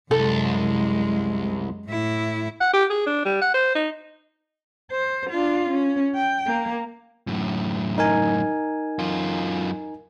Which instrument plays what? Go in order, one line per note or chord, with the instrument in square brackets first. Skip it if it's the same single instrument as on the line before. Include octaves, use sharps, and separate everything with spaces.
[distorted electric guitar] C2 [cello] F#2 G#3 [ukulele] A4
[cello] A2 E4
[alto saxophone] F#5
G4
G#4
D4
G3
F#5
C5
D#4
[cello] C5
D4 F4
C#4
G5
A#3
[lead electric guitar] F#2 A2
[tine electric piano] D#4 A#4 G#5
[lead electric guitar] F#2 F4